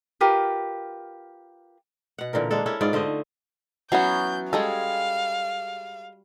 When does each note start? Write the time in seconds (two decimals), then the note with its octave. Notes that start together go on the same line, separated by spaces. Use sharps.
0.21 F4 G4 A#4 B4
2.18 B2 F#5
2.33 A#2 D3 E3 A#4
2.51 G#3 A#3 D4 A4
2.66 C#4 E4 A4
2.81 G#2 B3 F4 D5
2.93 D3 A3 C5 D#5
3.92 E3 F#3 B3 C#4 F#5 G6
4.53 G3 G#3 G#4 A4 F5